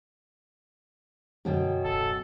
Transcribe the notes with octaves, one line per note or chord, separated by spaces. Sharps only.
F#2 B2 D3 G5
D1 A4